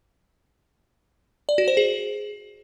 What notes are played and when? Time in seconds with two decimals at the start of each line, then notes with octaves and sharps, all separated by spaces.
1.49 D5
1.58 F#4
1.68 C5
1.77 G#4